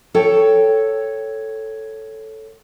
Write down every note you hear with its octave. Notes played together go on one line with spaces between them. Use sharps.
A4 C#5 G5